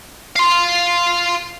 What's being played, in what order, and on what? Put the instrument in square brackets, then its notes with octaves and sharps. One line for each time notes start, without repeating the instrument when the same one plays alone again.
[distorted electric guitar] F5 C6